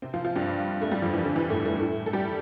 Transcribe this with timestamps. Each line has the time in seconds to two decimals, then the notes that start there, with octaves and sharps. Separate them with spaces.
0.02 C3 C4
0.14 F3 F4
0.25 F3 F4
0.36 G2 G3
0.82 A3
0.91 G2 G3
1.02 F2 F3
1.13 E3
1.24 D3
1.36 E3
1.50 A2 A3
1.66 A2 A3
1.79 A2 A3
2.06 A4
2.13 G3 G4